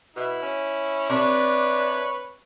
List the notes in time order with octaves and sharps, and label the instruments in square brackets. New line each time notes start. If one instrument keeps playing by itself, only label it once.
[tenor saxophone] B2 [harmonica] E4
[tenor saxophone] C#4
[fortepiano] C3 [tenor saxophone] D4 [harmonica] B4 C#5